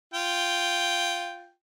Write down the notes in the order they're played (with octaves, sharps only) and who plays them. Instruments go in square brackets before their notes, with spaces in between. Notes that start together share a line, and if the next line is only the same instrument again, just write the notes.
[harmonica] F4 G5